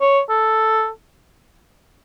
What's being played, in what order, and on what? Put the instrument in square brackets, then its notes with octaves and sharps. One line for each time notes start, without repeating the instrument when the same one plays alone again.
[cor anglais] C#5
A4